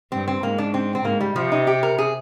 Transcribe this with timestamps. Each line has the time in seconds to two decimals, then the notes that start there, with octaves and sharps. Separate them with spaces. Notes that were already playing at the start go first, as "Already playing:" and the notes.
0.12 G2 C4
0.28 C4
0.43 G#2 A#3
0.58 D4
0.74 C4
0.95 C4
1.05 G#2 A#3
1.21 G3
1.36 C3 F3
1.52 D#4
1.67 G4
1.83 A#4
1.98 G#4